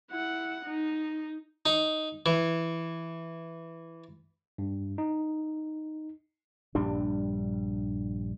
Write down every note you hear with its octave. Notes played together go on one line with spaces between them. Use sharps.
E4 F#5
D#4
D#4
E3
G2
D#4
A#1 G2 G3 D4